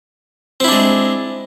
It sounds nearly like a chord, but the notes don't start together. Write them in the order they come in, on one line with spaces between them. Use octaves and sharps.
C4 E4 D4 G#3